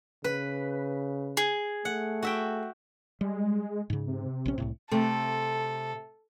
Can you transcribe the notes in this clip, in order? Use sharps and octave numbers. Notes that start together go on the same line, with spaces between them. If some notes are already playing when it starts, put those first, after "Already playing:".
C#3 B4
G#4
A3 F#5
F#4 E5 G5
G3 G#3
G#2 C#3
C3
A#1 C#4
C2 F2 A2
C3 A3 A4